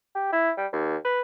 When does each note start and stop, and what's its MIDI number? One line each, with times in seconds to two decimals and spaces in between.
0.15 0.28 67
0.33 0.51 64
0.57 0.67 55
0.72 0.97 39
1.05 1.22 71